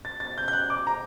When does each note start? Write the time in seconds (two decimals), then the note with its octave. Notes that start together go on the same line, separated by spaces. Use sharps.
0.05 A6
0.20 A6
0.38 G6
0.48 G6
0.53 F#6
0.70 D6
0.87 A#5